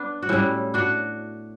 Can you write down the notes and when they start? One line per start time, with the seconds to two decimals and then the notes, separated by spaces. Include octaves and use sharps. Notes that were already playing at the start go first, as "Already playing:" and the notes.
Already playing: B3 D4
0.23 F#4
0.29 A2 G3 C#4 E4
0.74 D4 F#4